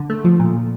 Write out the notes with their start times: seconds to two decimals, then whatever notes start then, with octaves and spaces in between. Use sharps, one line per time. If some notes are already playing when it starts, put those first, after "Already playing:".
Already playing: D3
0.10 A3
0.25 F3
0.40 A#2